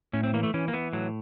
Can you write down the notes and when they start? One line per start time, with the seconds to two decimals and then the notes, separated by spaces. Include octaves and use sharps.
0.13 A2 C#4
0.23 C4
0.33 E3 A#3
0.43 A3
0.54 E3 C#4
0.68 A#3
0.73 E3 B3
0.93 A2 F#3